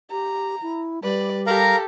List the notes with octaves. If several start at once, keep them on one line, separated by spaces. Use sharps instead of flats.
G4 A#5
E4
G3 B4 D5
G4 A4 A#4 F5 A#5